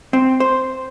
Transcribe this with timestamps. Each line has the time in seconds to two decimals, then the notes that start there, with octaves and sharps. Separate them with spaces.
0.13 C4
0.40 C5